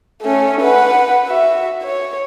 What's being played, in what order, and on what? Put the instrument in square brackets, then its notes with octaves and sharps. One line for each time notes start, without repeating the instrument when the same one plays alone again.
[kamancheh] A3 C#4
B4 F#5
F#4 E5
C#5